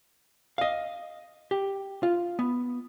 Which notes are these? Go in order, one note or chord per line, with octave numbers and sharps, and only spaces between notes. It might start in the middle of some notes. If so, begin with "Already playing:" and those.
D#5 F5
G4
F4
B3